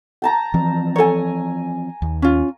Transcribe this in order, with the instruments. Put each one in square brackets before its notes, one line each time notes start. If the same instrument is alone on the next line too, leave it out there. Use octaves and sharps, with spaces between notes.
[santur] G5 A5 A#5
[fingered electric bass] E3 F3 C4
[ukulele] A4 C#5 [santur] G#5 A#5
[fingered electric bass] D#2
[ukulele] C#4 F4